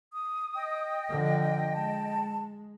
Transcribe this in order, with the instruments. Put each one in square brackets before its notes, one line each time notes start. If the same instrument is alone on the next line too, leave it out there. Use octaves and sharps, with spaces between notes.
[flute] D#6
[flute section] D#5 G5
[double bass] D3 F3
[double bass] G#3 [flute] A5